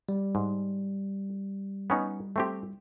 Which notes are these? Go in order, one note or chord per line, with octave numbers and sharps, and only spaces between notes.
G3
G#2
B3 C#4 D#4
A3 C4 G4